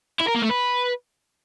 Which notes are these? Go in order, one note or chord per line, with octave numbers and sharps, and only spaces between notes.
E4
A#4
A#3
A3
B4